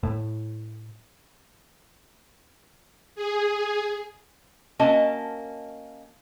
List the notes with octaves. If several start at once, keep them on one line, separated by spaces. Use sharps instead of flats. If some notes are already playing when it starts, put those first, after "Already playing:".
A2
G#4
A#3 C#4 F#4 D#5 E5 A5